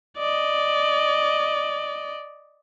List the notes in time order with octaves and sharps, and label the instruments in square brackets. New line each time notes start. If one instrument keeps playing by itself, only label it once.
[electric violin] D5 D#5